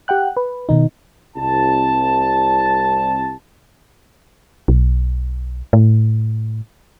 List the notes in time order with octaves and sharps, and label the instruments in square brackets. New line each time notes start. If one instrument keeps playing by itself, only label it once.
[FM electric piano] G4 F#5 G5 F#6
B4
B2 D#3 D#4
[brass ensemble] C2 A5
[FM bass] B1
A2